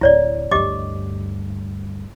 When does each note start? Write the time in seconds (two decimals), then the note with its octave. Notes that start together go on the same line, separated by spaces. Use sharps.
0.01 D1 D2 E4 C#5 D5
0.51 D2 G2 G4 D#5 D6